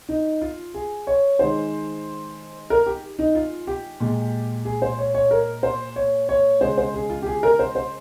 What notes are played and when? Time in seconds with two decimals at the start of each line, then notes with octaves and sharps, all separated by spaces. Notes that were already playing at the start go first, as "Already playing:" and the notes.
0.09 D#4
0.41 F4
0.74 G#4
1.07 C#5
1.39 D#3 G#3 C5
2.70 A#4
2.86 G4
3.19 D#4
3.35 F4
3.67 G4
4.00 A#2 G#3
4.65 G#4
4.82 C5
4.98 C#5
5.15 C#5
5.31 A#4
5.63 C5
5.96 C#5
6.29 C#5
6.61 C#3 G#3 C5
6.78 C5
6.94 G#4
7.10 F4
7.22 G4
7.27 G#4
7.43 A#4
7.59 C5
7.75 C5